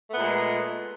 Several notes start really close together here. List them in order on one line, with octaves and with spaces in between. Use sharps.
A3 B3 A#2 G#3